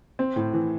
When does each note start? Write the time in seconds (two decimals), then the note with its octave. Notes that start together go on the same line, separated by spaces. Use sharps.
0.19 C4
0.36 A2
0.53 E3